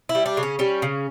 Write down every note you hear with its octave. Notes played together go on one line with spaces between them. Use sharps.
E4
G3
D4
C#3
C#4
G3 C#4
C#3